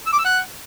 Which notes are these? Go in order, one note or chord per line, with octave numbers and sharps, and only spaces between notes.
E6
D6
E6
F#5